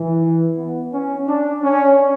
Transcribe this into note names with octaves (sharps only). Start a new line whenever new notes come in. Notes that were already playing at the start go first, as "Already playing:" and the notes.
Already playing: E3
B3
C#4
D4
C#4